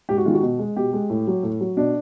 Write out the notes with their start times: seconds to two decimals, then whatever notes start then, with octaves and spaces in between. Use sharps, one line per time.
0.09 G#2 G4
0.17 F#4
0.25 D#3 G#3 F4
0.34 F#4
0.42 B2
0.59 G#3
0.77 B2 G4
0.93 G#3
1.10 A2
1.27 F#3
1.43 A2
1.61 F#3
1.77 B2 D4